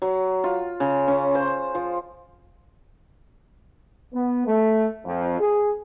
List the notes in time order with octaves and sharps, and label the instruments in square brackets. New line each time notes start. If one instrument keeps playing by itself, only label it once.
[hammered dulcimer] F#3
F4
C#3
C#4
C5
F3
[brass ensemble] B3
A3
F2
G#4